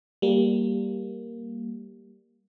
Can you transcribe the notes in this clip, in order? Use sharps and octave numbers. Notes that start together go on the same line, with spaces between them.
G3 A#3